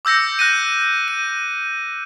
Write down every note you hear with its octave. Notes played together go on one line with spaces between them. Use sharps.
D6 E6 G6 A#6 C#7
F#6 A#6 D#7
D#7